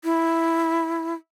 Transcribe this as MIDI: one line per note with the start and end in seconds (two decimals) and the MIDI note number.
0.04 1.14 64